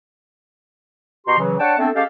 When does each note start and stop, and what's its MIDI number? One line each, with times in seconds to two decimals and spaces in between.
1.26 1.38 47
1.26 1.38 66
1.26 1.38 67
1.26 1.38 82
1.26 1.38 84
1.38 1.55 49
1.38 1.55 52
1.38 1.55 54
1.60 1.74 62
1.60 1.74 73
1.60 1.74 78
1.60 1.74 79
1.60 1.74 81
1.79 1.89 57
1.79 1.89 59
1.79 1.89 60
1.79 1.89 62
1.79 1.89 69
1.95 2.02 56
1.95 2.02 61
1.95 2.02 67
1.95 2.02 69
1.95 2.02 77